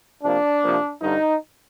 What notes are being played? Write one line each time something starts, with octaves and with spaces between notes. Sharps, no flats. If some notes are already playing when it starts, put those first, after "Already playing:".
C3 F3 A#3 D4
C3 F3 A#3
G2 D3 G3 D#4